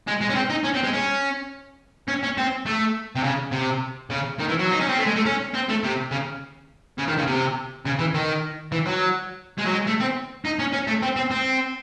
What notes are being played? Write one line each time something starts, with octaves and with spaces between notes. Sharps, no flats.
G#3
G#3
C#4
C4
D#4
C#4
C4
G#3
C#4
C#4
C#4
C4
A3
C3
C#3
C3
C#3
D#3
E3
F#3
D#4
C#4
C4
A3
G#3
A3
C#4
C4
A3
C3
C#3
C#3
D#3
C#3
C3
C#3
E3
D#3
E3
F#3
G#3
F#3
G#3
A3
C4
D#4
C#4
C#4
A3
C4
C4
C4